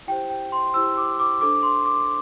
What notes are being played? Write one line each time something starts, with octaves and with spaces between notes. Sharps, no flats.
E4 G4 C5 G5
G5
C6
E4 G4 C5 E6
D6
D6
D4 A4 C5 D6
C6
D6